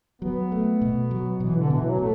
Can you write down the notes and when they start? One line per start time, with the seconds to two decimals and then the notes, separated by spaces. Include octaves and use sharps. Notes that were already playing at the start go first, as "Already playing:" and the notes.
0.21 F#3 B3
0.52 A3
0.81 B2
1.11 F#3
1.40 B2 E3
1.55 D3
1.69 B2 E3
1.85 F#3
1.98 B2 A3